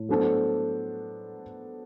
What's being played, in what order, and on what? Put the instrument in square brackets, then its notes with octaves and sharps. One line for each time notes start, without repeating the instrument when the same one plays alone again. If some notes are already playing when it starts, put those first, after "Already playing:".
Already playing: [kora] A2
[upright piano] F#3 B3 D4 A4 C5